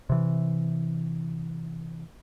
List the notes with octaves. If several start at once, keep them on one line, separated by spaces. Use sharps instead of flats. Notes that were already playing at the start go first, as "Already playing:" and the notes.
C3 E3